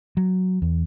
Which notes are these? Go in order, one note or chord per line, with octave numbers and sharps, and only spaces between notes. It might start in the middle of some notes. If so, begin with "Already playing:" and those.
F#3
E2